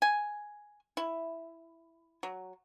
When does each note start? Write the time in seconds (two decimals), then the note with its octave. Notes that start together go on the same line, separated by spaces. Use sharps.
0.02 G#5
0.97 E4
2.23 F#3